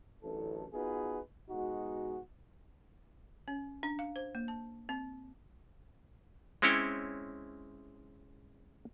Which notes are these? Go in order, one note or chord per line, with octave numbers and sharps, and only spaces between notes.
A1 F#2 D3 E3 A4
B3 D#4 F4 F#4 G#4 B4
B2 G#3 D#4 F#4
C#4
D4
F5
C5
A#3
A5
C4
G#3 C4 C#4 E4 C#5 G5